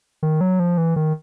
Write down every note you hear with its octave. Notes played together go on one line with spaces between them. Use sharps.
D#3
F#3
F3
E3
D#3